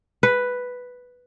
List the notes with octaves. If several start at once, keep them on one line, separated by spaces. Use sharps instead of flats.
B4